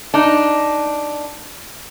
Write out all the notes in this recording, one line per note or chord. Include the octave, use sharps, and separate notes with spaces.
D4 D#4